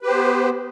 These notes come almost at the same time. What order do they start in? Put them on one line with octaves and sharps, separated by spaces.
B4 G4 C5 B3